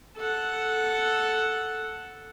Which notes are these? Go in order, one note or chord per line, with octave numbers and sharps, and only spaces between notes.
A4 F#5